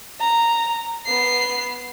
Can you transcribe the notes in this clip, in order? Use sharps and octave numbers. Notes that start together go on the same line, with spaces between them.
A#5
B3 C7